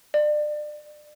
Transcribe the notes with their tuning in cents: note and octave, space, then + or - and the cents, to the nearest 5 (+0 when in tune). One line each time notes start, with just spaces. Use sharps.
D5 +30